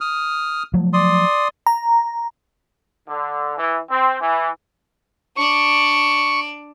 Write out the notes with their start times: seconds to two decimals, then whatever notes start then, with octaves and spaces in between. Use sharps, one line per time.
0.01 D#6 F6
0.73 F3 F#3 A3
0.93 D5 C6 D#6
1.66 A#5
3.09 D3
3.58 E3
3.90 C4
4.20 E3
5.37 D4 D5 C#6